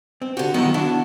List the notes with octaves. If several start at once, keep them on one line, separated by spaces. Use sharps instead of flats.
C4
D3 F#4 G4
D#3 F#3 B3 E4 D#5 F#5
D4 E4 F#4